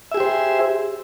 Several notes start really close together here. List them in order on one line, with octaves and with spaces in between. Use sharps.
E5 G#4 G4 C5